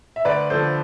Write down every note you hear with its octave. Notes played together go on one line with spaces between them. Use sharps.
E5
D2 B4 D5
D3 F3 A4 C5